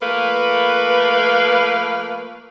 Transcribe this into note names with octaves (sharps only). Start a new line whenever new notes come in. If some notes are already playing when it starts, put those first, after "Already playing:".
F3 A3 A#3 B4